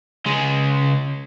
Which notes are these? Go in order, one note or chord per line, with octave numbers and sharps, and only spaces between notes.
C#2 G#3